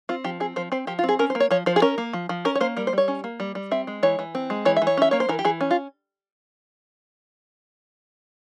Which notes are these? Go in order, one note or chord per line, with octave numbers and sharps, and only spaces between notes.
C4 F4
F3 G4
C4 G#4
F3 C5
C4 C5
F3 G4
F4
C4
G#4
C#4 A#4
C5
A#3
C#5
F3 C#5
F3 C5
G#4
C#4 A#4
A#3
F3
F3
C#4 A#4
C#5
A#3 C5
G3 A#4
C5
G3 C#5
C#4
A#3
G3
G3
C4 E5
G#3
E3 C#5
E3
C4
G#3
E3 C#5
E5
E3
C#5
C#4 E5
A#3 C#5
C5
E3 A#4
G4
E3 G#4
C#4
F4